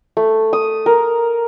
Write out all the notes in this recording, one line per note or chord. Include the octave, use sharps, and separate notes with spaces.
A3
D#6
A#4